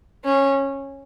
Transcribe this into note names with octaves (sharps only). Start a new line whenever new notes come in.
C#4